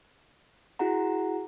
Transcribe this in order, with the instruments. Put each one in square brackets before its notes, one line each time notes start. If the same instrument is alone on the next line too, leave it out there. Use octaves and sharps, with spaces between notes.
[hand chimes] E4 F#4 G#4 F#5 A#5